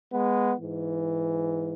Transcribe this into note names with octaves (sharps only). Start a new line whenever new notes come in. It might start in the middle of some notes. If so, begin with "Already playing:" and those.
G#3 B3
G#2 E3